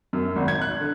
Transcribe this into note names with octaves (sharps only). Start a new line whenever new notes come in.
F#2
G#1
G#6
F#6
D3